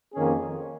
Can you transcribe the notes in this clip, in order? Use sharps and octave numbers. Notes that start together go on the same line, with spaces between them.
F2 D#3 A#3 C#4 G#4